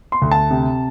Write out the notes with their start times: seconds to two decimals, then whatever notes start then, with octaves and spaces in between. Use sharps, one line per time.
0.12 C6
0.22 D2
0.31 A5
0.51 C3